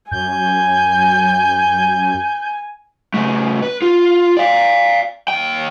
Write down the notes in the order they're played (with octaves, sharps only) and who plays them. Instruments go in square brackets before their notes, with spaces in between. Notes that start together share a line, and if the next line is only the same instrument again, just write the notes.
[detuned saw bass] F#2 [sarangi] G#5 [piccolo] G6
[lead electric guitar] C#3 A3
B4
F4
D5 F5
D#2 G5